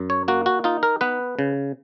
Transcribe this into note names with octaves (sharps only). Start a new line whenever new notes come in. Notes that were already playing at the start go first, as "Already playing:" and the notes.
Already playing: F#2
C#5
A#3 F#4
F#4
D#4 F4
A#4
B3 B4
C#3